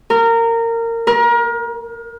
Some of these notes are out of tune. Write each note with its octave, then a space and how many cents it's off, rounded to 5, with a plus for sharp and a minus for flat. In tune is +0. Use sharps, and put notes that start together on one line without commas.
A#4 -20
A#4 +30